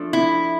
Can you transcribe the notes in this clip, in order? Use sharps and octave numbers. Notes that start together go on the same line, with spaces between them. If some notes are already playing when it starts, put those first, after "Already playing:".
Already playing: F3 A3 D4
E4